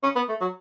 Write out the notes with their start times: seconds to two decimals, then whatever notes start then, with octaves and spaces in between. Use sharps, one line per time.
0.03 C#4
0.16 B3
0.29 A3
0.41 F#3